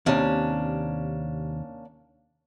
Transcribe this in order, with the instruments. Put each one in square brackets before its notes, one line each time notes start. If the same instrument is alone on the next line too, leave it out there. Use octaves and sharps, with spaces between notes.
[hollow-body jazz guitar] D#2 C3 [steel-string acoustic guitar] A#3 C#4 D4